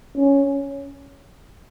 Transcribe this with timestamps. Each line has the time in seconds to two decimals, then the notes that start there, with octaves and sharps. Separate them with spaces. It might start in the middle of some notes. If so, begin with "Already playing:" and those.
0.16 C#4